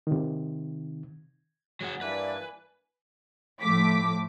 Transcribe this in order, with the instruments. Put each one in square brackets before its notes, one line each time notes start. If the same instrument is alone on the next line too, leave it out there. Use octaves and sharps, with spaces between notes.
[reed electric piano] C3 D#3
[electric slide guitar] F#3 G#4 F#5
[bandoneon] G2 E3 A#3 [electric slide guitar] B4 [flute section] D5 E5
[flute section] G#5
[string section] A2 F3 A3 D6 B6